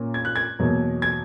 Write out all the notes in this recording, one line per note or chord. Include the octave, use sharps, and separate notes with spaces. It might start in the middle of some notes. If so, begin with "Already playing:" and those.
Already playing: A#2 A#3 C#4
G#6
F#6
G#6
E2 B2 F#3 A#3
G#6